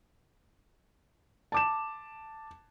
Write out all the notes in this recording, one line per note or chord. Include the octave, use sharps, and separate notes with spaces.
A5 D6 E7